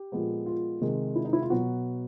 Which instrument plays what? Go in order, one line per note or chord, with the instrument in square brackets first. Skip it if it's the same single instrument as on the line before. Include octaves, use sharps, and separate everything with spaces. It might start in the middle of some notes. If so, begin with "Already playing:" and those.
Already playing: [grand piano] G4
A#2 F3 G#3 B3
F4
C3 D#3 G#3
E4
D#4
E4
F4
B2 F#3 B3 F#4